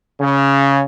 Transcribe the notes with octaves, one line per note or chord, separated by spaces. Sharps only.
C#3